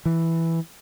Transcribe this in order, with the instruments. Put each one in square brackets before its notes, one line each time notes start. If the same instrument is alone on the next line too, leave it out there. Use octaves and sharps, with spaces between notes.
[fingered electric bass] E3